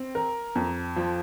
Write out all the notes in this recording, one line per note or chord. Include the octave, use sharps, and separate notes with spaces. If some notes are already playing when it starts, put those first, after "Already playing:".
Already playing: C4
A#4
F2
F3